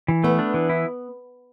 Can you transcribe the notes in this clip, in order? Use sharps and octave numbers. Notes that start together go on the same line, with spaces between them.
E3
A3 B3
D4
E3
E4